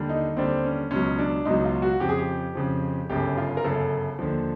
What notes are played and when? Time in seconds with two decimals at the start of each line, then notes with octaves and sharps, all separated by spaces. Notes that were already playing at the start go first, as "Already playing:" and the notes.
Already playing: D#2 D3 G3
0.09 D#4
0.37 D#2 D3 G3 C4
0.64 C#4
0.91 C#2 B2 F#3 C#4
1.18 D4
1.45 C#2 B2 F#3 D#4
1.65 F4
1.82 F#4
2.00 F2 C#3 F3 G4
2.09 G#4
2.18 G4
2.55 F2 C#3 F3
3.09 G1 F#2 C#3 G4
3.37 F4
3.57 A#4
3.64 G1 F#2 C#3 A4
4.19 D#2 D3 F3